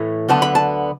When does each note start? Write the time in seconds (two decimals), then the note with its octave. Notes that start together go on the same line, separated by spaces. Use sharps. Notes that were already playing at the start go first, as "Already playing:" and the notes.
Already playing: A2 E3 A3
0.29 D2 D3 F#3 B3 A5
0.42 B5
0.55 A5